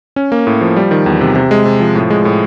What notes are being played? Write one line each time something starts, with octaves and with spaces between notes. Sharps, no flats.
C#4
A#3
A2
F3
G3
D#3
E2
C3
C3
G#3
C3
F3
A2
G#3
A2